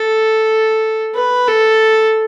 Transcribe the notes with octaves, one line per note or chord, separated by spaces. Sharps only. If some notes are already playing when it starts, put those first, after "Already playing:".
Already playing: A4
B4
A4